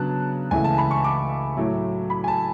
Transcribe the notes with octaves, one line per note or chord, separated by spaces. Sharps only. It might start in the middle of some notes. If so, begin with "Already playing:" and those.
Already playing: C#3 F#3 B3 D4 A5 F#6
C#2 C#3 E3 A3 E4 G#5
A5
B5
C#6
D6
A2 F#3 A3 E4
B5
G#5
A5